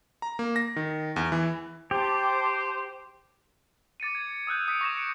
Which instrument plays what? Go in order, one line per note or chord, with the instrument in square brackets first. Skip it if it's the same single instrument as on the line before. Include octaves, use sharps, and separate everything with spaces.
[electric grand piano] A#5
A#3
A#6
D#3
E2
E3
[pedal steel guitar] G4 [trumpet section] C5 [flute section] A5 D6
[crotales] D6 A6 C#7 D#7
G#6
D#6 E6 F#6 G6
D#6 B6 C#7 D7
C#6 A#6 E7
C#7 D7